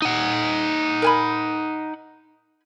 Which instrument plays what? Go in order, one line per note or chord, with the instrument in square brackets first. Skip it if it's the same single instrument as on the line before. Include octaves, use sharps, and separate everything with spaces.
[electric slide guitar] D#4 F#5
[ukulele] A#4 G#5 B5